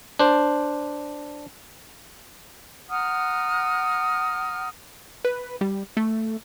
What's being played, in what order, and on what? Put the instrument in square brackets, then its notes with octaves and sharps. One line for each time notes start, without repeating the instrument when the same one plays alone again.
[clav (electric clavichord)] D4 C5
[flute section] F#5 A#5 D#6 F6
[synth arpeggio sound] B4
G3
A3